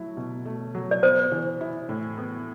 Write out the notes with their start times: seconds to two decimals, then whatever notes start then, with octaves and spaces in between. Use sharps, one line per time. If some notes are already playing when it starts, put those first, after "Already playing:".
Already playing: F#3 A3 E4
0.17 B2
0.46 A3
0.75 F#3
0.91 D5
1.03 B3 C5
1.32 E3
1.61 E4
1.89 A2
2.18 B3